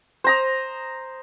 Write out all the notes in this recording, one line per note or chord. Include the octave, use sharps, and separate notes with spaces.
C5 A#5 D#6